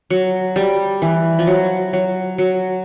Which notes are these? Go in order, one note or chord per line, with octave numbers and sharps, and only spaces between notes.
F#3
G3
E3
F3
F#3
F#3
F#3